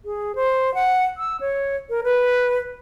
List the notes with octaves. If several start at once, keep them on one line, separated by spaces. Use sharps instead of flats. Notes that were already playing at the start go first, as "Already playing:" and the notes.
G#4
C5
F#5
E6
C#5
A#4
B4